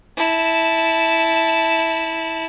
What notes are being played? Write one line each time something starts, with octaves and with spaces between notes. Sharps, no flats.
E4 A5